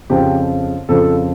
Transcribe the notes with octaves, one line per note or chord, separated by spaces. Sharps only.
F2 C#3 F3 G4
F2 C#3 F3 A4